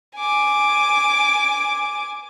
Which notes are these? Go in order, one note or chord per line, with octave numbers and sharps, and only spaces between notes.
G#5 D6